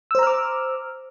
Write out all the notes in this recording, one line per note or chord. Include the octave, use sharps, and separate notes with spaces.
C5 A#5 D6 E6 F6